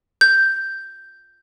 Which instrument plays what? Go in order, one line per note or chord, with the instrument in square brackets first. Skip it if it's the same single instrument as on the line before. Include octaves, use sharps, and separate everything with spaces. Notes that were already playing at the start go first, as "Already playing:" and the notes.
[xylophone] G6